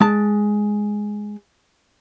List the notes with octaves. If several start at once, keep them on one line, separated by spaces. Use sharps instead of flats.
G#3 A5